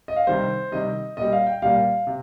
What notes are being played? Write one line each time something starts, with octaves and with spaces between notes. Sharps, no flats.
D#5
F5
C3 D#3 G3 C5
C3 D#3 G3 D#5
A#2 G3 D#5
F5
G5
A#2 G3 F5
C3